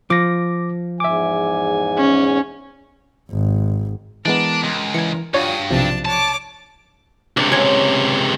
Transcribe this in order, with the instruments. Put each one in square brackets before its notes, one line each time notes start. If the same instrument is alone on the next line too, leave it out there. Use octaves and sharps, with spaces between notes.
[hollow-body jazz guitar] F3 [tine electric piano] D6 A#6
[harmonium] E2 G#2 G#5 [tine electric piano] E5 D6
[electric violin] C#4
[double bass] G#1
[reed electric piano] E3 G#3 B3 [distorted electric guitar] D4 [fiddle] A#4
[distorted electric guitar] C#2
[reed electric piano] E3 [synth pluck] G#6 C#7
[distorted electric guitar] G2 [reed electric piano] D4 F4 [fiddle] F#4 D#6 [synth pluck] C#5
[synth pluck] B1 C3 [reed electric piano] F3 [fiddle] D4 A5
[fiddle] C#5 D6 [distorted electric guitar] A5
[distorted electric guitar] C#2 C3 [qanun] D4
[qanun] C#4 C#5 F#5